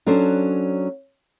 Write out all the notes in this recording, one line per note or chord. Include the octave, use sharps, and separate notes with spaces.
F#3 C#4 D4 A4 C5